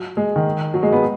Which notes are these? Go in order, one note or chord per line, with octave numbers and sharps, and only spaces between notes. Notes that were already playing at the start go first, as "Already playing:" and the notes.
Already playing: F#3
G#3
D#3
F#3
G#3
B3